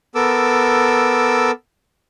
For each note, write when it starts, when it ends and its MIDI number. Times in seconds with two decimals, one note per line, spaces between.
0.15 1.51 59
0.15 1.51 69
0.15 1.51 70
0.15 1.51 86
0.15 1.51 88